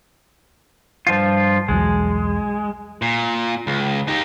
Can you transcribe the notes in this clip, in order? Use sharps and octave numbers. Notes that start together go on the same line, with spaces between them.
G2 F3 F4
B1 E2 F#3 G#3
A#2
C#2
D#4 G4